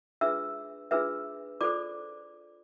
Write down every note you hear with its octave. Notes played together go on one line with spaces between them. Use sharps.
D4 F4 G#4 B4 E5 E6
D4 F4 G#4 B4 E5 E6
F4 A4 C5 D5 D6